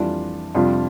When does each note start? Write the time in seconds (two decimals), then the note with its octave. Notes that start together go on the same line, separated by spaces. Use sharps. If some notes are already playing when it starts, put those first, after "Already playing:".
Already playing: F2 E3 G3 D4 F4
0.54 F2 C3 G3 D4 F4